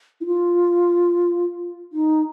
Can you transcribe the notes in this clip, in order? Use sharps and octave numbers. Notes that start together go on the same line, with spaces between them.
E4
F4
D#4